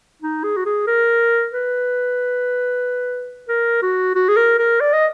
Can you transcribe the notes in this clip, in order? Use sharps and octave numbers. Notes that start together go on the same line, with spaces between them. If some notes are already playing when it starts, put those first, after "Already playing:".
D#4
G#4
F#4
G#4
A#4
B4
A#4
F#4
F#4
G#4
A#4
A#4
D5
D#5